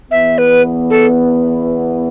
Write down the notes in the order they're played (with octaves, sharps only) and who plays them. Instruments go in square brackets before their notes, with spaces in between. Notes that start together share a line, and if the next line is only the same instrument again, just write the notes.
[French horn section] E2 E3 B3 [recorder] E5
[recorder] B4
A4